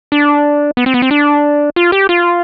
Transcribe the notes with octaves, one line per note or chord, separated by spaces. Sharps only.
D4
B3
C4
B3
C4
D4
F4
G4
F4